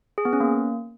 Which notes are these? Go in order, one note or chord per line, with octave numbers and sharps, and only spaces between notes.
G#4
B3
C#4
A#3